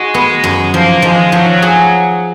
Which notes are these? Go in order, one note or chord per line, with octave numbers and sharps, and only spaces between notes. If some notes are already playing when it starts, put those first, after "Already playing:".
Already playing: G#3 F#4
B3
F#2
F3 A#3
F3 G#3
F3 F#3
G#4